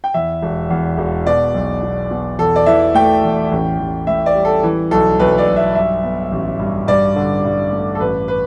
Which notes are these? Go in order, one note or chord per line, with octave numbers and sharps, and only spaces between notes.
G5
E2 E5
E1
E2
E1
B2 D5
B1
B2
B2
E2 A4
D5
E3 E5
A3 G5
E2
A1
A1
A2 E5
D5
G3
A4
E3
B1 A4
B1 B4
D5
B1
E5
G2 E5
B3
A1
G2
G2 D5
D3
G2
A3
A4
A1 B4
B4